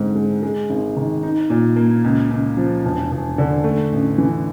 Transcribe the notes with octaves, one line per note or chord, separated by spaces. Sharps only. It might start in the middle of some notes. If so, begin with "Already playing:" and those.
Already playing: G#2 D3 C4
G#3
G#3
G#1
D#3
D#4
A#2
A#3
C#2
C#2
F3
E1
E1
D3
A3
A1
E3